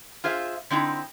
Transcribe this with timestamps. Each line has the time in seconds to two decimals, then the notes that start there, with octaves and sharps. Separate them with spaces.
0.24 F4 G#4 C5 E5 F5
0.70 D3 C4 D#4 E4